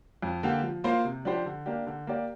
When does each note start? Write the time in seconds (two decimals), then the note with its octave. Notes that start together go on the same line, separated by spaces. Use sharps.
0.22 F2
0.43 D3 A#3 G4
0.63 F3
0.84 A#3 F4 C5
1.05 C3
1.25 F3 D4 G4 C5
1.46 D3
1.66 A#3 D4 G4
1.87 D3
2.07 A#3 G4 D5